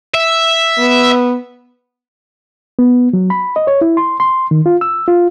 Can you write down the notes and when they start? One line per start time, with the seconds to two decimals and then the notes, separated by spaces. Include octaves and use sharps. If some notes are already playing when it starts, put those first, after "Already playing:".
0.14 E5
0.78 B3
2.79 B3
3.13 F#3
3.30 B5
3.56 D#5
3.67 C#5
3.81 E4
3.97 C6
4.20 C6
4.51 D#3
4.66 F4
4.81 E6
5.08 F4